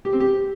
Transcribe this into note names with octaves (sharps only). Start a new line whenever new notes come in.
G4
C4
G4